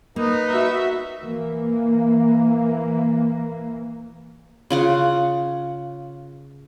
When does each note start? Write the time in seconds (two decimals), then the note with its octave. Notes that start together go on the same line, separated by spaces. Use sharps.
0.16 A#3 B3 D#4 B4
0.51 F#4 E5
1.22 E3 A#3
4.70 C#3 F4 F#5